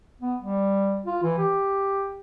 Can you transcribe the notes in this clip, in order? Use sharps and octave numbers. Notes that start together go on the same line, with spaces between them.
B3
G3
F4
E3
G4